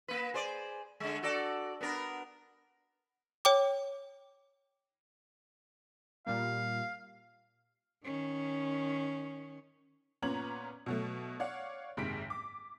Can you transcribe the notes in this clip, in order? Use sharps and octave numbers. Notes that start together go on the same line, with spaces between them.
A#3 B4
G#4 C5 D5
D3 G#3
F#4 A4 D5
B3 D4 A#4
C#5 G5 D6
A#2 G3 A#3 F5
D#3 C#4
A#2 B3 C#4 A#5 G#6 F#7
B2 F#3 A3
C#5 D5 F5 F#5
F#1 G#2 C3 D#3 B6 D7
D6